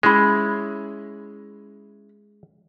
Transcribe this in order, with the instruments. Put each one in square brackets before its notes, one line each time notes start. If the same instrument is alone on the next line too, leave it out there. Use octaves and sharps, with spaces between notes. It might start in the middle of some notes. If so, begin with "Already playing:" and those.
[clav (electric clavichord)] G#3 [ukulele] C#4 E4 B5